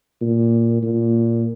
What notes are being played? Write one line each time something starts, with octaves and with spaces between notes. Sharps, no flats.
A#2
A#2